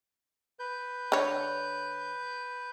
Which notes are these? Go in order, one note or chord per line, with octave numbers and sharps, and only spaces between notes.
B4 G6
D3 C#5